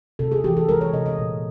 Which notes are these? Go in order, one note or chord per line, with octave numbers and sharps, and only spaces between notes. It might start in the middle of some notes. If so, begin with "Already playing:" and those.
C3 A4
G#4
E3 G4
A4
G#3 A#4
C#5
C3 D#5
D#5
A#2